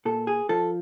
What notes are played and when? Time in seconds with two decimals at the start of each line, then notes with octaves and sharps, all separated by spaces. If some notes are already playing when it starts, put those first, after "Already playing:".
0.05 A#2 A4
0.27 G#4
0.49 F3 A4